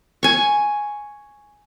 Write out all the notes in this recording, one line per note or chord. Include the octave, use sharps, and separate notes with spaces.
G#5 C#6